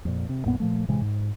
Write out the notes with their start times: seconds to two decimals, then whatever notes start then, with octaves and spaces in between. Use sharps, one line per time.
0.05 F2 A#2
0.29 C3
0.45 A1 F#2 A#2 B3
0.60 A#2 F3 A3
0.88 A2 C3 E3 G#3
1.01 G#2